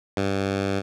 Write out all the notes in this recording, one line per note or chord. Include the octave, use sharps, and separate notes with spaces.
G2